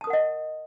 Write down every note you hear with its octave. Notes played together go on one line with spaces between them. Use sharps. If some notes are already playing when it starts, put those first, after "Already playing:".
A#4 D#5 F#5 A5 D#6